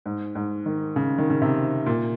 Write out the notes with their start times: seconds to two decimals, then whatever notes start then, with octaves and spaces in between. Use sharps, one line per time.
0.06 G#2
0.35 G#2
0.66 D#3
0.96 C#3
1.18 D#3
1.30 C#3
1.42 C3
1.86 A#2